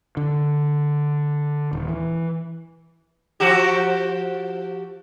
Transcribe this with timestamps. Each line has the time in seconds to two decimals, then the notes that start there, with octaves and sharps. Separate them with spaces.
0.17 D3
1.73 D#1
1.88 E3
3.40 F3 F#4 G4